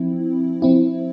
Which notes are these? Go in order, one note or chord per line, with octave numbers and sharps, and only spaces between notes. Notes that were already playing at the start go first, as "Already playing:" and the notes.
Already playing: F3 C4 E4
F3 C4 E4